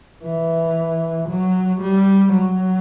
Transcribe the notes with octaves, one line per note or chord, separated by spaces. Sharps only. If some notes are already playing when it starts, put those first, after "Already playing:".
E3
F#3
G3
F#3